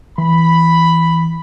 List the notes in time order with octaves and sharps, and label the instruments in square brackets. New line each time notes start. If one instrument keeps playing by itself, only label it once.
[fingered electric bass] E3 [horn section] B5